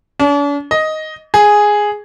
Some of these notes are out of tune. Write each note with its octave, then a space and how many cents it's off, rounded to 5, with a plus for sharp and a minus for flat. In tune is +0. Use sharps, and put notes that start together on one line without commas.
D4 -45
D#5 +5
G#4 +0